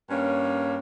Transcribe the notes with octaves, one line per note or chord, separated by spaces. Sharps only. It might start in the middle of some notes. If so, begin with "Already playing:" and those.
G2 A#3 C#4